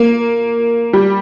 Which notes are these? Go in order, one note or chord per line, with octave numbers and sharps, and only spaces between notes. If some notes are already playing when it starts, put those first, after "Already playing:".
Already playing: A#3
G3